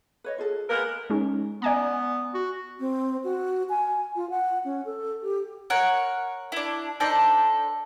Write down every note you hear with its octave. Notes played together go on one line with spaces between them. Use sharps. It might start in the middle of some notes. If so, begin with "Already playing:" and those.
B4 C#5 D#5
F4 G#4 A4
G#3 B3 A#4
G#3 C#4 D#4
B3 D5 G#5 A#5
F#4
C4
F#4
G#5
F4
F#5
C#4
A4
G4
A#4 C#5 F#5
D4 E4
D4 D#4 A4 C5